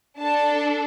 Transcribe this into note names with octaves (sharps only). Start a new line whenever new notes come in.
D4 A4 A5